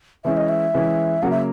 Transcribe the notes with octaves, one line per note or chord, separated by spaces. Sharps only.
E3 G#3 C#4 E4 E5
D#5
E5
E3 G#3 C#4 E4
C#3 F#3 A#3 F#5
E5